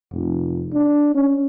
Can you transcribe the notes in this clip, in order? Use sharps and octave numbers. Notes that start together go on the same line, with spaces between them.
F1
D4
C#4